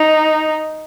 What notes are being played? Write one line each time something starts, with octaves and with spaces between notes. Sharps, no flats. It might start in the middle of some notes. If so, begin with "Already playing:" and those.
Already playing: D#4